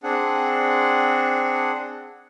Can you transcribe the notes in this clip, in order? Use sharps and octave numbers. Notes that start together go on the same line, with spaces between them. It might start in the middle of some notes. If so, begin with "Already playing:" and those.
C4 D4 G#4 F#5